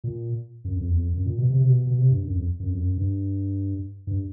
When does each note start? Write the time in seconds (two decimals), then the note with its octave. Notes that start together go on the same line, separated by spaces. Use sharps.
0.04 A#2
0.64 F#2
0.76 F2
0.89 E2
0.95 F2
1.13 F#2
1.26 A#2
1.38 B2
1.50 C3
1.61 C3
1.68 B2
1.87 B2
1.98 C3
2.11 G2
2.24 F#2
2.35 F2
2.60 F#2
2.70 F2
2.78 F#2
2.97 G2
4.07 G2